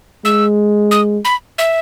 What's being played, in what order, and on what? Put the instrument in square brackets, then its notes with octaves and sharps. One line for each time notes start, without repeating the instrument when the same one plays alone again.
[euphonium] G#3 [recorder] E6
[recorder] D#6
B5
E5